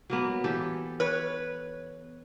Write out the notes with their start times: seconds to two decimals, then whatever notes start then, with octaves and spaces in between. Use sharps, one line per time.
0.10 F#3 A#3 B3
0.44 E3 G4 A4
1.00 B4 C#5